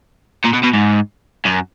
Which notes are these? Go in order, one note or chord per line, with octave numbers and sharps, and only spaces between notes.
A#2
B2
B2
G#2
F#2